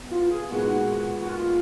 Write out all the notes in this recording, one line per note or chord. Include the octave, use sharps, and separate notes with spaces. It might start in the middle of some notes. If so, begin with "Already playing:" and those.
Already playing: B3
F4
G#4
A#2 G#3 B3 D#4 F#4
F#4
F4